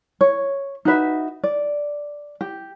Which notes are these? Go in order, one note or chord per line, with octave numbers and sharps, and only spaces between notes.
C#5
D#4 F#4 B4 E5
D5
G4